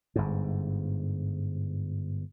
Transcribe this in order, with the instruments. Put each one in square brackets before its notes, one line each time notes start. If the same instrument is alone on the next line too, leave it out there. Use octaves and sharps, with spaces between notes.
[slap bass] G1 G#2